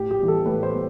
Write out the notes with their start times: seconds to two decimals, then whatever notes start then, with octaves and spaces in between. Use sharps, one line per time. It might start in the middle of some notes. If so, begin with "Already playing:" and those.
Already playing: A2 G4
0.11 G4
0.20 E3 G3 B3
0.28 A4
0.46 A2 B4
0.63 C5
0.72 G3 B3